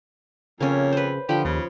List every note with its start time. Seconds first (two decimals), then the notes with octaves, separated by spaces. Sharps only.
0.60 F2 C#3 A#3 C#4
0.92 B4 C5
1.29 D3 F3 G4 B5
1.45 D#2 C#3